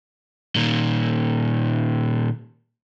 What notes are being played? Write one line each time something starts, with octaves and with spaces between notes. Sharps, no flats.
A#2 D#3